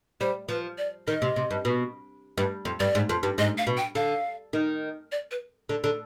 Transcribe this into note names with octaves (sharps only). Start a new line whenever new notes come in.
G3 C5
F3 B4
D5
D#3 D#5
C3
C3
G2
B2
G2
F2
G2 D5
G#2
F2
G2
G#2 D#5
F5
B2
G5
D3 F5
D#3
D5
B4
D3
D3